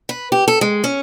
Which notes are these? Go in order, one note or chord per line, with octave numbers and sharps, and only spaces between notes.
B4
G4
A4
G#3
C#4